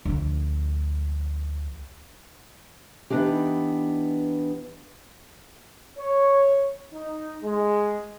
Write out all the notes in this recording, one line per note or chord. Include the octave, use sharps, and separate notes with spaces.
D2 F3
E3 F#3 B3 D4 D#4 G4
C#5
D#4
G#3